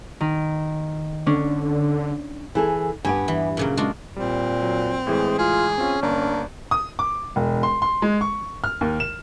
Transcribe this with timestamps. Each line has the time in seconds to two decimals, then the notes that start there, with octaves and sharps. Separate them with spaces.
0.21 D#3
1.26 D3 C#4 D4
2.55 E3 G#4 A4
3.05 G2 B3 G4 G#5
3.28 E3
3.57 A#2 C#3 F#3
3.77 G#3 D4 F4 F#4
4.16 A#2 G3 C4
4.62 F#3
5.07 A2 E3 G#3 G#4
5.39 F4 G#4
5.78 C4 C#4 F4
6.02 G1 A#3 D4 A#5
6.71 D#6
6.99 D6
7.36 E1
7.63 C6
7.82 C6
8.02 G#3
8.21 C#6
8.64 F6
8.81 D#2
9.00 E7